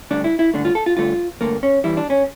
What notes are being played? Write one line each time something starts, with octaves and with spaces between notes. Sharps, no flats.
G2 D3 A3 D4
E4
E4
G2 D3 A3 D4
F4
A4
F4
G2 D3 A3 F4
G2 D3 A3 A#3
C#4
E2 E3 G3 E4
D4
C#4